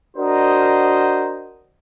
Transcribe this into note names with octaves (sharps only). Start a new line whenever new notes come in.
D4 F#4 A#4 C5 D#5